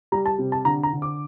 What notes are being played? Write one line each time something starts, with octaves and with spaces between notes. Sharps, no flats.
G3 A#5
A5
C3
A5
D3 A#5
A#5
D3
D6